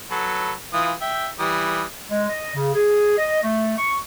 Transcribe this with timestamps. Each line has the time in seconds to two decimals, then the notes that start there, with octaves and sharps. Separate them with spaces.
0.11 F#3 A4 B4
0.74 E3 F4 D#6
1.02 E5 G5
1.40 E3 G3 D#6
2.09 G#3
2.28 D#5
2.55 C#3
2.74 G#4
3.18 D#5
3.43 A3
3.78 C#6